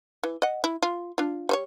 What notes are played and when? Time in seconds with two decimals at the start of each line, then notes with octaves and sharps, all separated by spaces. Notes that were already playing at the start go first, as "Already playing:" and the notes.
0.23 E3
0.42 D#5 F#5
0.64 E4
0.82 F4
1.18 D4 F4
1.49 G3 C5 C#5